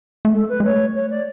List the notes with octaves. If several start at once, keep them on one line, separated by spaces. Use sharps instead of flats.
A3
G#3 A4
B4
G#3
A3 C#5
C#5
D5